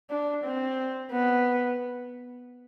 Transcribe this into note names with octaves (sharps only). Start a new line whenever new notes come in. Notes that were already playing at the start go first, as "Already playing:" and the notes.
D4
C4
B3